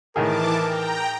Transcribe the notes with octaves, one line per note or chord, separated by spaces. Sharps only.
A2 D#3 E3 G#4 A#4 A5 D6
G5 A#5